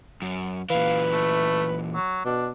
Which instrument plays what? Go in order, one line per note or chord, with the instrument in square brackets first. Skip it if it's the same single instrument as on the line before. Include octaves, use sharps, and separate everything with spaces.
[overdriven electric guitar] F#2
[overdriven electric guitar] A#2 E3 [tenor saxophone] B4 [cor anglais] F5
[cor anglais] A3
F#3
[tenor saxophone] B2 [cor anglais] D4